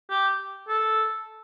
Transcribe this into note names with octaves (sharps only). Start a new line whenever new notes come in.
G4
A4